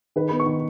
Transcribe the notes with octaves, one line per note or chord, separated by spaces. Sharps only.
D#3 B4
B3 B5
C#6
D#3